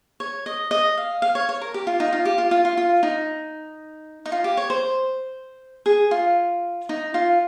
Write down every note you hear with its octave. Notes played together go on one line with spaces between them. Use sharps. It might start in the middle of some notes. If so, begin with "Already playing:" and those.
C#5
D#5
D#5
F5
F5
C#5
C#5
A#4
G4
F4
D#4
F4
G4
F4
F4
F4
F4
D#4
D#4
F4
G4
C#5
C5
G#4
F4
D#4
F4